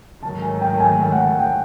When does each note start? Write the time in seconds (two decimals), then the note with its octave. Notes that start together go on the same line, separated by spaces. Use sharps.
0.23 G#2 D#3 F#3 A3 A5
0.42 G#5
0.61 G5
0.76 A5
0.80 G#5
1.00 G5
1.12 F#5
1.19 G5
1.39 G5